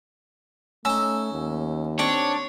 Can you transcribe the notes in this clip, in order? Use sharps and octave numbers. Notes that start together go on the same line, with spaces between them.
A3 C#4 D#4 E6
D#2
C4 D4 C#5 D5